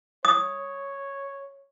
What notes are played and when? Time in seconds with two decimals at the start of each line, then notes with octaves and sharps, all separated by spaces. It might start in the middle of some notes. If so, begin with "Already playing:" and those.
0.25 C#5 D#6